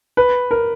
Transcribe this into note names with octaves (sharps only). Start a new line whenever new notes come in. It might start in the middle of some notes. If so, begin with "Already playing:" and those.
B4
A#4